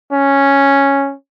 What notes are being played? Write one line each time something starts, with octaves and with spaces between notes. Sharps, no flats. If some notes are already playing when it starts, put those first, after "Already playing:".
C#4